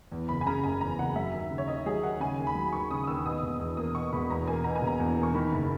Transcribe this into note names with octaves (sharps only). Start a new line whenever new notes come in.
E2
F#1 B5
G#5
C#3 A#5
F#1 G#5
E2 A#5
F#1 F#5
F#3 E5
D#2
C#3
C#5
D#2 D#5
F#3 G#4
D#2 F#5
C#3 G#5
D#2
B5
F#3
D#2 C#6
C#3 D#6
D#6
D#2 E6
B2 D#6
E1
E2
A#3 D#6
B2 C#6
E1 B5
E2 A#5
A#3 G#5
B2 A#5
G#5
E1 A#5
E2
A#3
C#6
D#3 B5
F#1